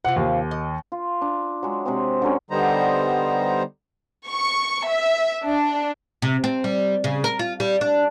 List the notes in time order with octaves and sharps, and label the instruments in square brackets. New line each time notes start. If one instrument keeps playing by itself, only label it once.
[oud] C3 F4 [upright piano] F#5
[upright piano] D#2
[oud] D#5
[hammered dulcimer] F4
D4
F#3 G#3
C3 G#3 C4
D3 F#3 C#4
[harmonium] D3 G3 B3 D#4 C5 A#5
[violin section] C#6
E5
D4
[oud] C3
C4
G3
C#3
A#4
F4
G3
D4